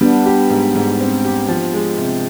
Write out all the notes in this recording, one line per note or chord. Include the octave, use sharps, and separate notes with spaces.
G3 B3 D4
G4
G#2
G#2
C4
G4
F3
G#3
C3